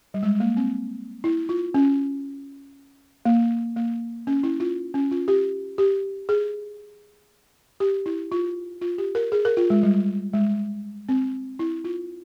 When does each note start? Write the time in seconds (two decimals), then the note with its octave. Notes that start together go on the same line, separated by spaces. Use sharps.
0.14 G3
0.23 G#3
0.40 A#3
0.57 C4
1.24 E4
1.49 F4
1.74 C#4
3.25 A#3
3.76 A#3
4.27 C#4
4.43 E4
4.60 F4
4.94 C#4
5.11 F4
5.28 G4
5.78 G4
6.29 G#4
7.80 G4
8.06 E4
8.32 F4
8.82 F4
8.98 G4
9.15 A#4
9.32 G#4
9.45 A#4
9.57 F4
9.70 G#3
9.83 G3
10.33 G#3
11.09 C4
11.59 E4
11.84 F4